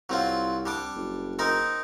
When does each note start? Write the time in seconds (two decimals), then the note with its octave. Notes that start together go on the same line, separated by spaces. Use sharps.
0.09 C2 F#3 C4 F4
0.66 G3 D4 D6
0.96 F#1
1.39 C4 D#4 A#4